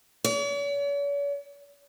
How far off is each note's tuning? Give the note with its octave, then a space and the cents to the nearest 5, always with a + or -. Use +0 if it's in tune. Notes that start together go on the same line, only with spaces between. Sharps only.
C#5 +45